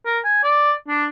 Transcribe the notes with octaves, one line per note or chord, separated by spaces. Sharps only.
A#4
G#5
D5
D4